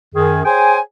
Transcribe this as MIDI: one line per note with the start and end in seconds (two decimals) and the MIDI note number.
0.15 0.41 42
0.15 0.41 51
0.15 0.41 68
0.45 0.79 68
0.45 0.79 72
0.45 0.79 73
0.45 0.79 79
0.45 0.79 80